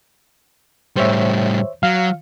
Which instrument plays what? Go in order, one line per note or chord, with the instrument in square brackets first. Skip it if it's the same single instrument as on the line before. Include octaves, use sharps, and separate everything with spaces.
[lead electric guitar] A2 G3 [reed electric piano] C5 C#5 E5
[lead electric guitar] F#3 [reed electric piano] F5